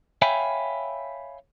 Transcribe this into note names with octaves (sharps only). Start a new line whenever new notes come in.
C#5 E5 F5 G5 G#5 B5